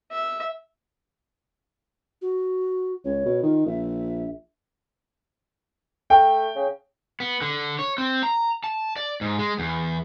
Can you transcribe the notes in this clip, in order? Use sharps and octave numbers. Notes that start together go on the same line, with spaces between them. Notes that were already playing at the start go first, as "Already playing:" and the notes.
E5
F#4
C#2 C#5
B2
D#3 F4
A#1 E5
A3 G5
C#3
B3
D3
C#5
C4
A#5
A5
D5
G#2
G#3
E2